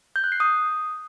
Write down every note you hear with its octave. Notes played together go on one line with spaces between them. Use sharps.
G6
F#6
C7
D#6